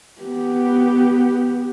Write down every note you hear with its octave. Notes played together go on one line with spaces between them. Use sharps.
B3 G4